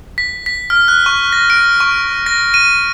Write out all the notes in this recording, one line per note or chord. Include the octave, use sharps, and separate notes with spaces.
B6
B6
F6
F#6
C#6
A#6
D7
C#6
A#6
D#7